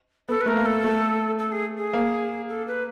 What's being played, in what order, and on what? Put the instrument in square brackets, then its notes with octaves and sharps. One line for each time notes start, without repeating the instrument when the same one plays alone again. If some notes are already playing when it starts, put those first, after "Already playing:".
[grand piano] B3 [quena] A4
[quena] B4
[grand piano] A3 [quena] A#4
[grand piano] A#3
[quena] A4
[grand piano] A3
[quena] A4
G#4
G#4
[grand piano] A#3
[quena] A4
B4